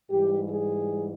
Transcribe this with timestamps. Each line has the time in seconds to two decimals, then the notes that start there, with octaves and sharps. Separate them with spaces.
0.10 G#2 E3 G3 G4
0.50 G#4